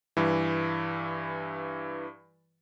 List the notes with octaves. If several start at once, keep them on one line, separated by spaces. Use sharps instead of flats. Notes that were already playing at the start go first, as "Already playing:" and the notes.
G2 E3